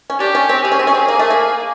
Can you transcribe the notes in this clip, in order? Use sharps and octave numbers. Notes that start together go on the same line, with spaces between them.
C#4
D4 G4
C#4
C4
C4 G#4
C#4
C4
C#4
C4
A#3
A3
A#3